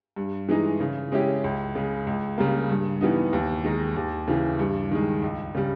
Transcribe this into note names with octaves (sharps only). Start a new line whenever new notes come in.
G2
E3 G#3 D#4
C#3
G#3 C#4 E4 G4
C#2
C#3 G#3
C#2
C#3 G3 A#3
G2
E3 G3 B3 D#4
D#2
D#3 G#3 D#4
D#2
C#3 E3
G2
D#3 G#3
C#2
C#3 G3